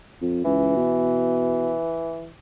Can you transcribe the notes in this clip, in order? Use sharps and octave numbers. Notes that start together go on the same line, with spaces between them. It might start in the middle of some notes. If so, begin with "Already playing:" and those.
F2
C#2 E3
B2